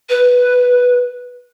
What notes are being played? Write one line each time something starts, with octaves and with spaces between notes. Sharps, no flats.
B4